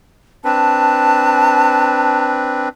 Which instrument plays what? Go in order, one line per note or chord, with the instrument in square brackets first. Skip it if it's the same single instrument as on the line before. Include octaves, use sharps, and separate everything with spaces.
[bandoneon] C4 D4 B4 [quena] A5